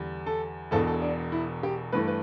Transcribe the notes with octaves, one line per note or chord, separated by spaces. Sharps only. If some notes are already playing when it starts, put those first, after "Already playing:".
Already playing: E2 D3 G3
A4
E1 E2 B2 A4
A4
D4
E4
G4
G2 E3 A3 B4
B4